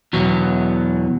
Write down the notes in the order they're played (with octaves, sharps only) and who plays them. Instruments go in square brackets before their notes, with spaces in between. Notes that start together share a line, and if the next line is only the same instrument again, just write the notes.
[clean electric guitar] E2 B2 F#3 B3